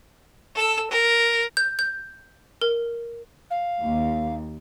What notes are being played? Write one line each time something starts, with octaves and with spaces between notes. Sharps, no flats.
A4 E6
A#4
G6
G6
A#4
F5
D#2